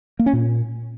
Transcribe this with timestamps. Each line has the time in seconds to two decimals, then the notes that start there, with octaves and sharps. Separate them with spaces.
0.19 A#3
0.26 C#4
0.33 A#2